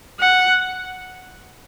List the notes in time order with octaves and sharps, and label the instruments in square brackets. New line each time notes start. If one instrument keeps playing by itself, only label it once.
[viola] F#5